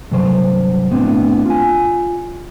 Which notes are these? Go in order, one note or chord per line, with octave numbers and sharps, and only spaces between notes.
G2 C3 F#3 C5
A2 B3 C4 D4
F4 G#5